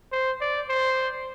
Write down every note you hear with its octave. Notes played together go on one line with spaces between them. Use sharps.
C5
D5
C5